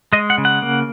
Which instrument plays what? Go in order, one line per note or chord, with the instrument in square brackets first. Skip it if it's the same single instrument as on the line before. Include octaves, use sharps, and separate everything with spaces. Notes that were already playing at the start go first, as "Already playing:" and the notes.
[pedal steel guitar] G#3 D#5
F#5
C#3
F#5
A#3